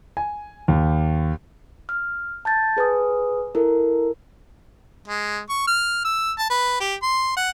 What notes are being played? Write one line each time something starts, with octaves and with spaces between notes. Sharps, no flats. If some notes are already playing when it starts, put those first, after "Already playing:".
G#5
D#2
F6
A5 G6 A6
G#4 B4 G#5 D#6
E4 A4 A#4
G#3
C#6
F6
E6
A5
B4
G4
C6
F#5